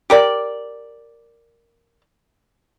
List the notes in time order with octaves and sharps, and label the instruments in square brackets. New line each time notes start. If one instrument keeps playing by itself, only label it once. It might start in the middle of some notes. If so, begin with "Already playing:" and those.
[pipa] G4 A#4 D5